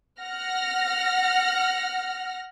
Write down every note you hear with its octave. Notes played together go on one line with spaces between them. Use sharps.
F#5 F6 A#6